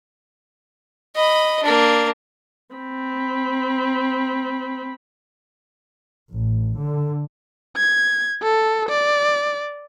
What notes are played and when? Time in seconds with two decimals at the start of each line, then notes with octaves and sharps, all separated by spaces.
1.15 D#5 B5
1.63 A#3 D4
2.75 C4 B5
6.31 A1
6.77 D3
7.77 G#6
8.43 A4
8.90 D5